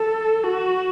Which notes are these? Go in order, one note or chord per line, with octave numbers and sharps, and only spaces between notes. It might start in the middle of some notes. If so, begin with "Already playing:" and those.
Already playing: A4
F#4